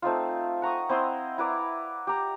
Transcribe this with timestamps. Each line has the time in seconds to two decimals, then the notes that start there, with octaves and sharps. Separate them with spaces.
0.02 A3 C4 D#4 F4
0.62 F#5 A#5 C#6 D#6
0.89 C4 E4 D#5 C6
1.38 E4 B4 D5 A#5
2.07 G4 A#5